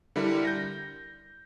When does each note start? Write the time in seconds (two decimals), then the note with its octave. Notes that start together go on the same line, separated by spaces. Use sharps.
0.16 D3 G3 E4 A#4
0.45 G6 A#6